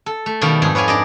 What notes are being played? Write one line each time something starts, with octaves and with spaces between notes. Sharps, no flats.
A4
A3
B2 D#3 G3 F#4 F5
F2 G#2 G#4
B4 C#5 D5 F5 G#5
D4 D5 D#5